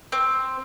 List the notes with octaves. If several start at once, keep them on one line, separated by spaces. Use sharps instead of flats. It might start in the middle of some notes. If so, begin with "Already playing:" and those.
C4